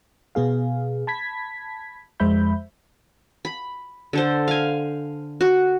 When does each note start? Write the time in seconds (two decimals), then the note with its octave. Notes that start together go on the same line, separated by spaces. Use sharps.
0.35 B2 B3 G#4 F5
1.07 A5 B5 G#6 B6
2.20 F2 G#3 C5 E5 B5 G6
3.45 B5
4.13 D3 A4 C5
4.48 F5 G#5
5.41 F#4